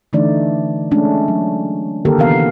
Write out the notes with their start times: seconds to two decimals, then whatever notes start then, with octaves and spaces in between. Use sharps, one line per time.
0.13 D3 E3 A3 D4 D#4 D5
0.91 G#3 A3 C#4 D4
1.28 F#3
2.05 D3 D#3 A#3 G4 A4 A#4
2.18 C3 E3 B3 A#4 F5